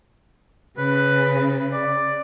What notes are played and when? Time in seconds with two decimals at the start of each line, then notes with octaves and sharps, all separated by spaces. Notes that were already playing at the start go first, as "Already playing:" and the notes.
0.78 C#3 B4
1.73 D5